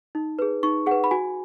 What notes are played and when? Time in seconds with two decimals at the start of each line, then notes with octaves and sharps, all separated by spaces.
0.15 D#4
0.39 G#4 B4
0.63 D#4 C#6
0.86 G#4 B4 F#5
1.04 B5
1.11 F#4 G#5